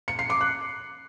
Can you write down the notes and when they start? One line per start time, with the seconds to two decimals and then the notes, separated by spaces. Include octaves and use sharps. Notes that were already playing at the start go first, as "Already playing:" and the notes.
0.08 C#7
0.19 C7
0.30 D6
0.41 F#6